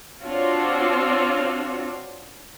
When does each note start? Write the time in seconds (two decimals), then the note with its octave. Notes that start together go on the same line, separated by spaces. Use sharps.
0.23 C4 D4 F4 F#4 C#5